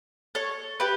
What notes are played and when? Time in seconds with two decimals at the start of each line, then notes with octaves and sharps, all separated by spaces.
0.35 A4 C#5
0.80 G4 B4